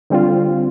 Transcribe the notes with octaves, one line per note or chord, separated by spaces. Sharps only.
D3 G3 C4 F4